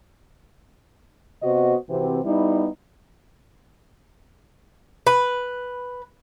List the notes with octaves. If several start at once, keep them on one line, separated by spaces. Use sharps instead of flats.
C3 B3 F#4 C5 D#5
C3 E3 C4 F#4 G4
G3 B3 D#4 E4
B4